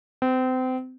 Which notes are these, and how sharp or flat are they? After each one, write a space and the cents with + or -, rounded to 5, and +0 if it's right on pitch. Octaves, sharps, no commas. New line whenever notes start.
C4 -30